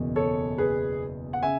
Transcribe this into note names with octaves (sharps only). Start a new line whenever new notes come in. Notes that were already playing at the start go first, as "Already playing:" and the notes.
Already playing: F#1 E2 B2
A4 C#5
G#4 B4
F#5
C#3 E5 G#5